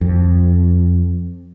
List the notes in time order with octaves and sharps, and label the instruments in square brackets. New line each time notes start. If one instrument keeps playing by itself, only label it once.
[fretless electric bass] F2